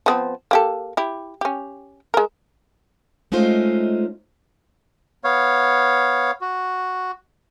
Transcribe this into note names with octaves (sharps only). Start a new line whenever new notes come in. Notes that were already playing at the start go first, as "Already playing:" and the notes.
F3 B3 C4
A#3 G4 A4
E4 G4
C#4 G4
G#3 A#4
G#3 A3 C#4 D#4 F4 C5
B3 C#5 F5
F#4